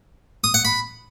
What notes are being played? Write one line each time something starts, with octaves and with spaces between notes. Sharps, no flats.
D#6
F#5
B5